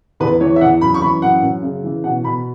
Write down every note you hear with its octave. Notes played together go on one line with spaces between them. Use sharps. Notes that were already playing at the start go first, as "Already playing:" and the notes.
E2 B4
E3 C#5
E5
E2 F#5
F#2 B5
C#6
E3 B5
F#2 F#5
F#2
C#3
E3
B2 F#5
B2 B5